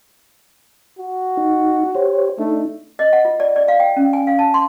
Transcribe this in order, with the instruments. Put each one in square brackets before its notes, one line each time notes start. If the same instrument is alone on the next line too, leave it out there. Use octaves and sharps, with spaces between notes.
[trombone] F#4
[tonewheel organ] D#4
G4 C5 C#5
[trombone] A3 [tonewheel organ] D4 D#4
[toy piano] D#5
F#5
F4
D5
D5
F5
G5
C#4
G#5
F5
A5
C6